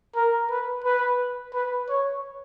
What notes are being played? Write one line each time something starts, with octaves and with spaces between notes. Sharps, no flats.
A#4
B4
B4
B4
C#5